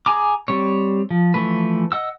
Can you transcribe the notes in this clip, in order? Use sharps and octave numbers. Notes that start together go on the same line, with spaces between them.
G#4 G#5 A#5 D6
G3 C4 C#5
F3
E3 F3 A3 B4
D#5 F#5 E6